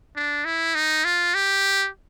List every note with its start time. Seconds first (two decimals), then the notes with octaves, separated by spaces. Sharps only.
0.16 D4
0.45 E4
0.75 D#4
1.05 F4
1.34 G4